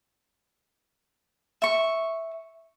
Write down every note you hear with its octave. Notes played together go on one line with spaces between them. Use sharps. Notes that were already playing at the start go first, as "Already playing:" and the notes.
E5 C#6